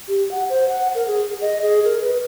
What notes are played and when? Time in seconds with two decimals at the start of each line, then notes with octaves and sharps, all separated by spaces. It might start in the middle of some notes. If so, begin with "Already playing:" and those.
0.08 G4
0.31 F#5
0.50 C5
0.68 F#5
0.95 A#4
1.07 G#4
1.41 D#5
1.62 G#4
1.85 A#4
2.01 B4